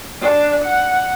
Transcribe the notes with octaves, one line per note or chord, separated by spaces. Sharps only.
D4
F#5